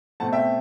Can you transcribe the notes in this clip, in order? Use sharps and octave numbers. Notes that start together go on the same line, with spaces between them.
B2 A3 C4 F#5 A5
E5 G5